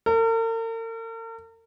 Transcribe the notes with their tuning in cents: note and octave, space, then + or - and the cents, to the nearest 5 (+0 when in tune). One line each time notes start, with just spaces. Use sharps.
A#4 -45